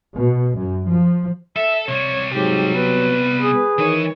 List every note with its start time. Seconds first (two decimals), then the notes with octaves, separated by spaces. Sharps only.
0.15 B2
0.57 F#2
0.92 F3
1.56 A4 E5
1.89 C3 G3 C#5
2.34 G#2 F#3 G4
2.75 B3 B4
3.41 G#4
3.78 D#3 E3 C#5 G#5